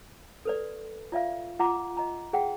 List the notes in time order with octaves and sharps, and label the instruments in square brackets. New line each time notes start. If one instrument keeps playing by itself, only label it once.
[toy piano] A4 B4 D5
F4 D5 E5 F5
F4 F#5 A#5 D6
D#5 A#5
G#4 F#5 G5